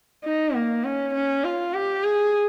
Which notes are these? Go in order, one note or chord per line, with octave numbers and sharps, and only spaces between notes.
D#4
A#3
C#4
C#4
F4
G4
G#4